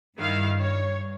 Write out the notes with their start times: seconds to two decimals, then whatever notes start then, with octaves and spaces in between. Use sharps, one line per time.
0.17 G2 D#3 E4 F5
0.60 C#5